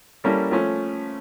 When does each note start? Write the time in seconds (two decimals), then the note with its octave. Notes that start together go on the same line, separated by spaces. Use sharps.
0.24 G3 A#3 C#4 E4 A4
0.51 F3 A3 C#4